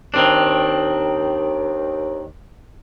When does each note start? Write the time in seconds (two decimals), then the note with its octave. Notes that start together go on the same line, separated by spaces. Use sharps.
0.14 D#2 D#3 C4 D4